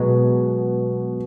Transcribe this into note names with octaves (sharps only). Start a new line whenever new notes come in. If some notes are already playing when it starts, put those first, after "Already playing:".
Already playing: B2 F#3 G#3 B3